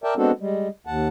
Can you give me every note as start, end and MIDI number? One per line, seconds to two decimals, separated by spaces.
0.04 0.14 70
0.04 0.14 74
0.04 0.14 76
0.04 0.14 79
0.04 0.14 81
0.17 0.31 56
0.17 0.31 59
0.17 0.31 60
0.17 0.31 62
0.17 0.31 66
0.17 0.31 69
0.40 0.68 55
0.40 0.68 56
0.87 1.08 39
0.87 1.08 78
0.87 1.08 81